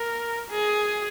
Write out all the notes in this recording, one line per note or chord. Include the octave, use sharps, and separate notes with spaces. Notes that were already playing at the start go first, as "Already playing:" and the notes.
Already playing: A#4
G#4